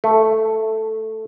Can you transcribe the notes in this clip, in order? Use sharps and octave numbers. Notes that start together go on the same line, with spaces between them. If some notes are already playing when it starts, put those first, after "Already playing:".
A3